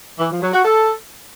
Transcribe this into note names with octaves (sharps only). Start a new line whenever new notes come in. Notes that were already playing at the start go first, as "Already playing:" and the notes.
E3
F3
F#3
F#4
A4